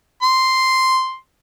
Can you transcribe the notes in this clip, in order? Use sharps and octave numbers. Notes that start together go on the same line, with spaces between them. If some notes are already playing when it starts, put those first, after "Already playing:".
C6